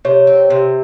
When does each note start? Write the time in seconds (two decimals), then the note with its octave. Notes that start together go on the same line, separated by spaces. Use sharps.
0.05 C3 C#5
0.27 C4
0.50 C3